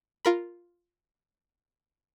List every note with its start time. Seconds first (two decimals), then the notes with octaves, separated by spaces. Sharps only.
0.25 F4 A#4 B5